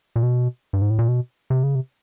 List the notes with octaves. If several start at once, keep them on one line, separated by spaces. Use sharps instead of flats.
A#2
B2
G2
G#2
A2
A#2
B2
C3
C#3
C3